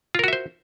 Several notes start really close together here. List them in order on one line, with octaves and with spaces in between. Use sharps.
F4 A#4 F#4 E5 C5